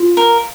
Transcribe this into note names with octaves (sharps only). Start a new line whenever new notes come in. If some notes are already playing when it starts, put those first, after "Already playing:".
Already playing: F4
A#4